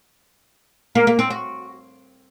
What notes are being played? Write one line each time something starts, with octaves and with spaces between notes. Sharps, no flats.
A#3
A#3
C4
F#4